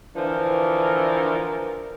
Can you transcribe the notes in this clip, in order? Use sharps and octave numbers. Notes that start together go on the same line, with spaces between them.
D3 E3 F3 A#4